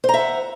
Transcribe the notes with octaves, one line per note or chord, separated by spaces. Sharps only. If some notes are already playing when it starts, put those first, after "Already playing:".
C5 E5 F#5 A#5